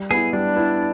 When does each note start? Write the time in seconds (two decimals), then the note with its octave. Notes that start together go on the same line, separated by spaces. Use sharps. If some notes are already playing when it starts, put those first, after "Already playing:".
Already playing: G3
0.11 B3 E4 G#4
0.33 G3 D4
0.56 B3 E4